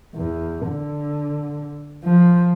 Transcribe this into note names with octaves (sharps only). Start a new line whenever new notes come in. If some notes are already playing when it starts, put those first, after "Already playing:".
E2
D3
F3